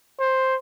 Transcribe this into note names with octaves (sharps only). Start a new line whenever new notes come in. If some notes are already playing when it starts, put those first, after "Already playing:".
C5